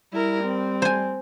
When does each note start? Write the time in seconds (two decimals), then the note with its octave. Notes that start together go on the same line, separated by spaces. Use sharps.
0.13 G3 E4 A#4
0.44 C4
0.82 C5 G#5